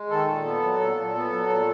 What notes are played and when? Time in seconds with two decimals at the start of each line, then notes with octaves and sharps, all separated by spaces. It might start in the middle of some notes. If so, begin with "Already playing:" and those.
Already playing: G#3
0.10 D#3 A4
0.27 A#2
0.45 B3
0.62 F#3
0.79 A#2
0.97 A#2
1.15 B3
1.32 F#3
1.49 A#2